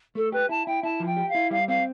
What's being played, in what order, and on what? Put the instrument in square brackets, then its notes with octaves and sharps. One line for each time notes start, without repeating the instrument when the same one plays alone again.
[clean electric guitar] A3 [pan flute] A4
[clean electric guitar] G4 [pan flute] B4
[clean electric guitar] E4 [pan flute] A5
[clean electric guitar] E4 [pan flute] G5
[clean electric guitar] E4 [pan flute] A5
[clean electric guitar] F3
[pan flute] G5
[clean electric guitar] G4
[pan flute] F5
[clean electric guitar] E4
[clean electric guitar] G3 [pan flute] F5
[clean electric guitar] C4 [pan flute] F5